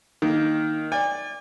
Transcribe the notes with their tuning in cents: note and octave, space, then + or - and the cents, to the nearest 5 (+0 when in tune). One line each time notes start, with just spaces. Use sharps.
D#3 +0 A#3 +0
D5 +0 G#5 -40